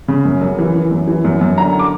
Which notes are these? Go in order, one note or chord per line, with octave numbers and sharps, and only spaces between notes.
C#3
F#2
F#2
E3
E3
F#2
E3
F#2
F#2
D3 A#5
D6